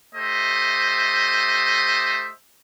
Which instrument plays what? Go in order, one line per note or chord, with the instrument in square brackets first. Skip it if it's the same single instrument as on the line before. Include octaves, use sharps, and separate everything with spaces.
[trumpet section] A3 G4 C5 D#5 E5